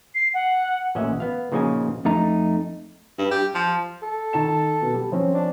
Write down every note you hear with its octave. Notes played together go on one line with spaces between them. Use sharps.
C7
F#5
A1 A#2 C#4 D#5 E5 F#5
B3 F5
A#2 C#3 F3 D#4 F#4 G#5
F2 A3 D#4 A#5
G2
G4
F3
A4
D#3 A5 E7
B2
G3
F3 C4 C#4
D4